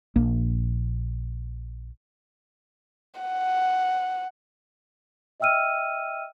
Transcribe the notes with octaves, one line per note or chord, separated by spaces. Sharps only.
A#1 A#3
F#5
D#5 E5 G5 E6 F6 D#7